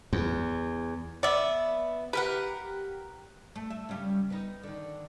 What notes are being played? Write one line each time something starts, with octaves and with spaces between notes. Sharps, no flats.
E2
B3 D5 E5
G4 A#4 B4 F#5
A3
E5
C#3 G3 C#4
B3 D#4
D3 D#3